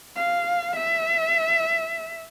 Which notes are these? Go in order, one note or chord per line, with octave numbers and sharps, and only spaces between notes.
F5
E5